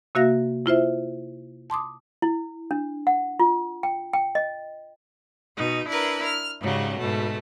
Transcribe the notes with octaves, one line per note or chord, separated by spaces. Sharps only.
C3 A#3 F#4 E5 F5 A#6
E4 F4 C5 E5
A5 C6 D6 D#6
E4
D4
F#5
F4
G5
G5
D#5
B2 D#4
D4 E4 A#4 B4
F6
G#2 C#3 F#3 G3
G#2 B2 A3